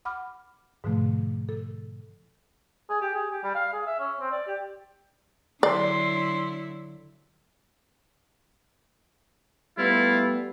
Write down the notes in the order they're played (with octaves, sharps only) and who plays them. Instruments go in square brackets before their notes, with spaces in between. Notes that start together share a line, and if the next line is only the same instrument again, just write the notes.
[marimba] F#5 B5 D6 F6
G#2 B2 D3 F3 A3
A4
[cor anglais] G#4
G4
G#4
G4
G3
F5
G#4
E5
C#4
C4
D5
G4
[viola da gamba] D3 F#3 E4 [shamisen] D5 [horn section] C6
[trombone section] G3 A3 B3 [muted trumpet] E4 [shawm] F4